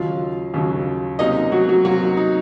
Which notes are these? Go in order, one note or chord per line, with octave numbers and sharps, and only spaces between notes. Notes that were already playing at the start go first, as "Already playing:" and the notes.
Already playing: D#2 C#3 F#3 F4 F5
D#2 C#3 F#3
C3 F#3 A#3 C#4 D#4 D#5
F#3 F#4
F#3 F#4
C3 F#3 A#3 C#4 F#4
D#4
D#4